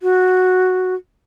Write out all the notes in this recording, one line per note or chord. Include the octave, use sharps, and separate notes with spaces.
F#4